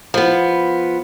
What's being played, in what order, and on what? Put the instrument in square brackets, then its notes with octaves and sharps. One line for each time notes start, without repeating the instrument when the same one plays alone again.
[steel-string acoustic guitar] F3 B3